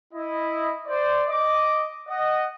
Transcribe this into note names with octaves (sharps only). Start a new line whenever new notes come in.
E4 D#5
C5 D5
D#5 D6
D#5 F#5